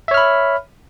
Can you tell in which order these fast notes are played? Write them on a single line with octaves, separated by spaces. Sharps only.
E5 C#5 F6 B5